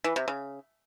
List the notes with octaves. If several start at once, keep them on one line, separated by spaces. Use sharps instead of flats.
E3
C3
C#3